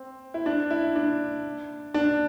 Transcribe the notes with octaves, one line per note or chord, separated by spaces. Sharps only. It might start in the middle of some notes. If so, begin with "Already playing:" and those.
Already playing: C4
E4
D4
E4
D4
D4